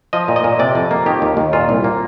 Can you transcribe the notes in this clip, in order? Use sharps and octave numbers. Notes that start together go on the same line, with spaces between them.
F3 D#5
A#2
D#5
A#2
C3 D5
F2
A#3
D#3 G4
D#2
D#2
A#2 F4
C2
A#3